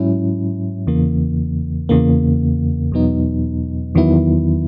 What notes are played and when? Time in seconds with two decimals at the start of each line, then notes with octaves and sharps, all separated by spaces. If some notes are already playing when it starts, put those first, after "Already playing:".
Already playing: G#2 F#3 C#4 E4
0.87 E2 C#3 E3 A#3
1.89 E2 C#3 E3 A#3
2.92 E2 B2 F#3 B3 D#4
3.95 E2 D#3 F#3 B3 E4